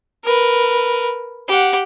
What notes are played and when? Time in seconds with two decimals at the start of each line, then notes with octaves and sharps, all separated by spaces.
0.24 A#4 B4
1.48 G4 F#5